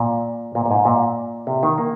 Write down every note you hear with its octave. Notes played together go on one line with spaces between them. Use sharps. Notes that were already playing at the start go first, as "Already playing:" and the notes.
Already playing: A#2
A#2
A#2
G#2
A#2
C3
D#3
A#3